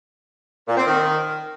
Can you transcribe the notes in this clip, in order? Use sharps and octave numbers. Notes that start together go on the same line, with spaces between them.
A#2
C4
D#3